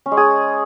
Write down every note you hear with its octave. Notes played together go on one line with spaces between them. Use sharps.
C#4
G#3
G#4